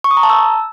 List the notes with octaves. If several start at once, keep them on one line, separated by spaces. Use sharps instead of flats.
C#6
D#6
A#5
A5
E6